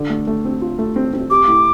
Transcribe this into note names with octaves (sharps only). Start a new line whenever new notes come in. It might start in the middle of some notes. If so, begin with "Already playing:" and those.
Already playing: D3
A3
A3
C4
F4
A3
C4
C4
G4 D6
A2